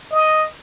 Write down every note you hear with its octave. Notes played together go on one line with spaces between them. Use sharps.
D#5